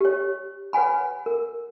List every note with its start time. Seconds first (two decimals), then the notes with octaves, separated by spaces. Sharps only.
0.01 G4 C#5
0.73 B4 C#5 F#5 G#5 B5
1.26 A#4